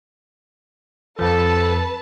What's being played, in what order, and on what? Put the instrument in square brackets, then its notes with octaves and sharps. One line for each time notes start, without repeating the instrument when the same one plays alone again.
[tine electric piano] F2 F3 [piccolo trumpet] A4 [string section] B4 A5